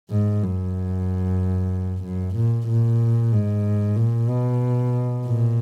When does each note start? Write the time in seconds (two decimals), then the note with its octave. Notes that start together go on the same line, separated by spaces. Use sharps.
0.11 G#2
0.43 F#2
2.04 F#2
2.36 A#2
2.68 A#2
3.33 G#2
3.96 A#2
4.29 B2
5.25 A#2